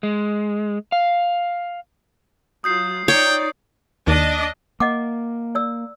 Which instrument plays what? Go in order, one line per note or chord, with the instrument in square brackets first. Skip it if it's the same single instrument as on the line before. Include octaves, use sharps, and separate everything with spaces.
[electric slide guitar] G#3
F5
[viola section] F#3 F4 [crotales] D#6 G6 C7
[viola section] D#4 D5 [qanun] C#5 [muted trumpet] G5
[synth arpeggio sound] D#2 [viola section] D4 D#5
[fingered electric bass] A#3 [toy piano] D#5 F#5 D6
[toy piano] D5 E6